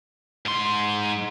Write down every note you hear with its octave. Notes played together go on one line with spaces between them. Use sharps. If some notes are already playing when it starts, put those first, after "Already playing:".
G#2 C6